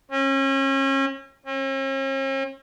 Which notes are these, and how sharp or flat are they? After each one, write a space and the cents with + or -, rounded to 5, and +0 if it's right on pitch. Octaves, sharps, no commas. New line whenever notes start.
C#4 -35
C#4 -45